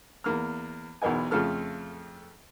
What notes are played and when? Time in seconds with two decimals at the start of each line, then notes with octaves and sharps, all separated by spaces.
0.24 E2 A#3 F6
1.02 B1 E2 A#4 D#5 G#5
1.31 F2 C#3 A3 F4 A4 F6